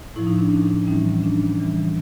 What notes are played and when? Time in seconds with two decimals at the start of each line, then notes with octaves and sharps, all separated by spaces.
0.16 A2 F3 E4
0.27 D#4
0.38 D4
0.49 C#4 D#4
0.87 A2 E3 G3 C#4 D#4
1.23 D4
1.59 C#3 E3 G3